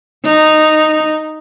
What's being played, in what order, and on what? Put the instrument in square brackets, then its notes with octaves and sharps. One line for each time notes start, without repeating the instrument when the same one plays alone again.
[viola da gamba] D#4